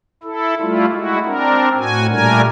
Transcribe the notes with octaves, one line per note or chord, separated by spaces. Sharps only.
E4 A4
G3 A3 E4 F4
G#3 E4 F#4
C4 D4 A#4
A2 F#4 G#5
A#2 G3 A3 D4 A#4 G#5